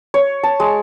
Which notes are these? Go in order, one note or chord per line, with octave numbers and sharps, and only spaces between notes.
C#5
A5
G#3